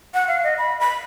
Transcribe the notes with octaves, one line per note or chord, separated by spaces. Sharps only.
F#5
F5
D#5
B5
B5